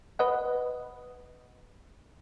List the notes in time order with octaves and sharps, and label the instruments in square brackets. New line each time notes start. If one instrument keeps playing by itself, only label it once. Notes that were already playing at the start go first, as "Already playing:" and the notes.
[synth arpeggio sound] B4 D#5 F#5